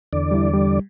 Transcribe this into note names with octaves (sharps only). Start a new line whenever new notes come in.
E2 D3 D5
G3 E4
G3